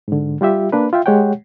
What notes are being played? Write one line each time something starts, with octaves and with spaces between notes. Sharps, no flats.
G#2 D3
G3 F4 G4 E5
A#3 D4 B4
F4 E5 G5
G#3 G4 C#5 F#5 G5